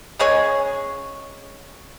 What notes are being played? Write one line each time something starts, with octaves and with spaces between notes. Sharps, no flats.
C#3 G#3 G#4 C#5